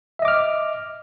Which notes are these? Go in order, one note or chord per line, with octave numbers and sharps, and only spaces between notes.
D#5 E5 D6 F6